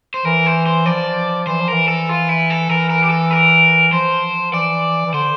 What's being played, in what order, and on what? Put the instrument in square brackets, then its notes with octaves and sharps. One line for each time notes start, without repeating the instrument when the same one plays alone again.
[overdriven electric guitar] C5
[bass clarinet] E3 [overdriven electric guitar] A#4
[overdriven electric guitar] C5
C5
[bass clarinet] F3 [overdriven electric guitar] D5
[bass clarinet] E3 [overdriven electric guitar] C5
[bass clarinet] F3
[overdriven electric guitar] A#4
[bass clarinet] E3
[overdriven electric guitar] A4
F4
E4
A4
[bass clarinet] E3 [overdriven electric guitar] A#4
[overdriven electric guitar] A#4
G4
A4
A#4
[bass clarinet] F3 [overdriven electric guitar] C5
[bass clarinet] E3 [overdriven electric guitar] D5
[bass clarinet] E3
[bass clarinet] D3 [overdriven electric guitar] C5